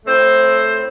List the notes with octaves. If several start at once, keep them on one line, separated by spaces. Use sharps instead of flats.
A2 A3 C4 C5